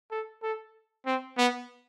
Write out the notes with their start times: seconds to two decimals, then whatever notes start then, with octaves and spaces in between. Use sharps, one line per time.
0.11 A4
0.43 A4
1.07 C4
1.38 B3